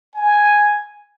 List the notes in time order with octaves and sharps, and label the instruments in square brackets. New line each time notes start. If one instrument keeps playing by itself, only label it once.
[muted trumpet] G#5